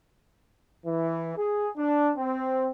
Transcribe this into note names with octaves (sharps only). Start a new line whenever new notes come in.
E3
G#4
D4
C4